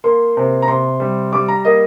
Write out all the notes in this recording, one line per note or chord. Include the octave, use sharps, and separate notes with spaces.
A#3 C6
C3
A#5
C3 C6
G3
G3 D6
A#5
A#3 D#5